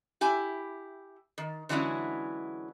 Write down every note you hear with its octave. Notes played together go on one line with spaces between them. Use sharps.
E4 G4 G#5
D#3
D3 E3 F#3 G#3 C#4 E4